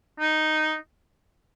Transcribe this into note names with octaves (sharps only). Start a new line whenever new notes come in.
D#4